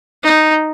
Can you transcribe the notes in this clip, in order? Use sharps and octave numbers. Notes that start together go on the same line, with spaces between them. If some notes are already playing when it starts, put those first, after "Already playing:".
D#4